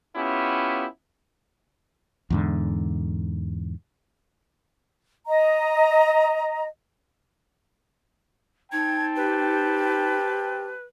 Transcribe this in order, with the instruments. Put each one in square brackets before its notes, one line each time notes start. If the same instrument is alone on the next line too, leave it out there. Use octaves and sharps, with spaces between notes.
[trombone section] B3 C#4 E4 F4 G4
[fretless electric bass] E2 G#2 D3
[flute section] D#5 A#5
[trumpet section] C4 G5 A5 [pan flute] D#4 [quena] G#6
[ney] G4 [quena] B4